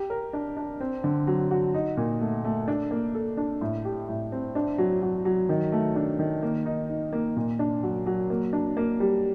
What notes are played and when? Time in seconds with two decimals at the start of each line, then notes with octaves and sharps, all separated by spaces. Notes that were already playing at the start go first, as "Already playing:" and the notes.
Already playing: G4
0.10 A#4
0.33 D4
0.57 D4
0.80 C4
1.04 D3
1.27 F#3
1.51 F#4
1.74 D#4
1.97 A#2
2.21 A3
2.44 A3
2.68 D4
2.91 A#3
3.15 A4
3.37 D4
3.61 A2
3.85 G4
4.09 A2
4.32 C4
4.55 D4
4.78 F#3
5.02 F#3
5.25 F#3
5.49 D#3
5.72 A3
5.96 D4
6.19 D#3
6.42 A#3
6.66 D#4
6.90 D#4
7.13 A#3
7.36 A#2
7.59 D4
7.83 F#3
8.06 F#3
8.30 A#3
8.53 D4
8.77 A#3
9.00 G3